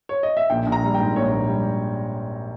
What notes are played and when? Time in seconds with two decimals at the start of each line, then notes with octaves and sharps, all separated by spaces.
0.09 C#5
0.23 D#5
0.37 E5
0.50 A#1 G5
0.66 A#1
0.72 A#5
0.83 G3
0.94 G5
1.00 G#2
1.16 A#1 C#5
1.33 A#1
1.49 G3